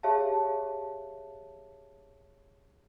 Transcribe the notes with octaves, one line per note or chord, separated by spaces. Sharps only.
G4 G#4 C#5 E5 F5 A5